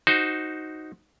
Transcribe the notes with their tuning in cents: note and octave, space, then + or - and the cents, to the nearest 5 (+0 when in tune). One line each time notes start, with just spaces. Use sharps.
D#4 +0 F#4 +0 C5 +0